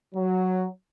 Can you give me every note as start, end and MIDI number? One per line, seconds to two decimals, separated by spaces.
0.15 0.67 54